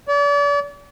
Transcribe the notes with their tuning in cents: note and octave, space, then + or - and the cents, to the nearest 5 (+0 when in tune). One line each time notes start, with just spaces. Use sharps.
D5 -40